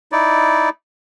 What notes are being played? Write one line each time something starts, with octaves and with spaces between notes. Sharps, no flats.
D#4 E4 D5